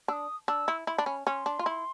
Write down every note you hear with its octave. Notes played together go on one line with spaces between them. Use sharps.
D4 D#6 E6
D4 E6
E4
E4 B5
D4
C#4
C#4 C6
D4
F4
E4